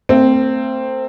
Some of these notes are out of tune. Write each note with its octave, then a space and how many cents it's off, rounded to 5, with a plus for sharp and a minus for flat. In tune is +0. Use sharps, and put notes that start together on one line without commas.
A3 +45 C4 +0